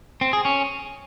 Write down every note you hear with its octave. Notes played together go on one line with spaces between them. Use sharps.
C4
G#4
C#4